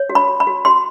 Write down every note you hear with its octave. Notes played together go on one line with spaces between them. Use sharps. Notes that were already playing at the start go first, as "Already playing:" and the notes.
Already playing: C#5
F#4
B5
F#4
B5
F#4
F#4 C6